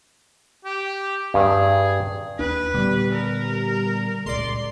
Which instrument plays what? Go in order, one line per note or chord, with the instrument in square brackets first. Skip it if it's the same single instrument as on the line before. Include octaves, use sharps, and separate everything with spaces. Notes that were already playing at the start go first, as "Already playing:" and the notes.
[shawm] G4
[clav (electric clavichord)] G2 [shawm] G#4
[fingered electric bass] D#2 D4 [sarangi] B4
[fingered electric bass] A#2 D3 B3 [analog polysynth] G3
[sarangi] A#4
[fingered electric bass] C#2 A#2 G#3 [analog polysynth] D5 C6